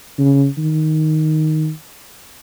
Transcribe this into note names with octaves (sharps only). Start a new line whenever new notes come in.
C#3
D#3